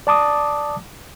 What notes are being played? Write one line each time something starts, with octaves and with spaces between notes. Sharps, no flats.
D5 A5 D6 D#6